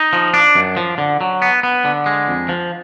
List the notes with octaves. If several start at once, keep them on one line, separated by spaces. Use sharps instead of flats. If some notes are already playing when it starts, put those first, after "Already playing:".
Already playing: D#4
F3
D4
F#2
F3
D3
F#3
B3
B3
D3
G#3
F2
F3